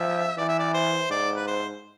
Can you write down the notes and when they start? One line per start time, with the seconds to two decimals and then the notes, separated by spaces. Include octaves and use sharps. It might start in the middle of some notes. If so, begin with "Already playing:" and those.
Already playing: F3 E5
0.37 E3 D5
0.48 E5
0.59 D5
0.74 C5
1.10 G#2 D5
1.37 B4
1.47 C5